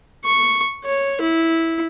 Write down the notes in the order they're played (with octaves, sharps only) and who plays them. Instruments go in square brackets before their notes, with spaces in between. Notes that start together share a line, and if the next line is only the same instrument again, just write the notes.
[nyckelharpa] C#6
C#5
E4